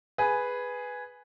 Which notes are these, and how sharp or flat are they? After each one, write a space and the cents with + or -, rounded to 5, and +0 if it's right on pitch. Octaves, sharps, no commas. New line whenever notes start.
G#4 +0 B4 +0